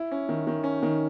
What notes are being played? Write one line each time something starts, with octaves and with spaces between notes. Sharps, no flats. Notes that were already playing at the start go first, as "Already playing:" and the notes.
Already playing: E4
C#4
D#3
D#3
C#4
D#3